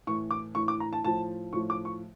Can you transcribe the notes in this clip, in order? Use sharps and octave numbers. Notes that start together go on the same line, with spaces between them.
A2 E3 C#6
D6
A2 E3 C#6
D6
A#5
A5
A2 F3 A5
A2 F3 C#6
D6
C#6